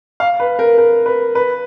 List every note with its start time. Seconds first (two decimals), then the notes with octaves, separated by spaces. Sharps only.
0.20 F5
0.40 B4
0.59 A#4
0.78 A#4
1.06 B4
1.35 B4